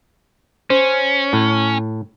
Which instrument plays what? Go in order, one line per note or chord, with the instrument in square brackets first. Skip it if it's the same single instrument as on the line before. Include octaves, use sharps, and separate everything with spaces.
[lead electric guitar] C#4 [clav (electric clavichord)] C5
[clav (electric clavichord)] A2